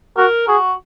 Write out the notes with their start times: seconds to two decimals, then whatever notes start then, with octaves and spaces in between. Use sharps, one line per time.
0.17 F#4 A#4
0.48 F#4 G#4